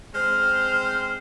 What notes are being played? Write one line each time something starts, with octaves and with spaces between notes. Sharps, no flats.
G#3 C4 C5 F6